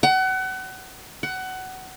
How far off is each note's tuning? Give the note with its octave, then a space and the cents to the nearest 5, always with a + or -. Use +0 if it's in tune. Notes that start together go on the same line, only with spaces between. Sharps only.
F#5 +30
F#5 +20